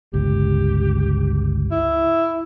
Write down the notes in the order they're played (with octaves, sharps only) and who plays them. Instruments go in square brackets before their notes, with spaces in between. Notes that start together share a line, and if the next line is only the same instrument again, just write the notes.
[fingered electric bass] G1 C#2 [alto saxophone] G4
[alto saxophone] E4